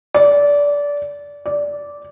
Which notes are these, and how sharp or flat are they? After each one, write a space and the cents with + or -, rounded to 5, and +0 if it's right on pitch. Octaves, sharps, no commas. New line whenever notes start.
D5 -20
D5 -10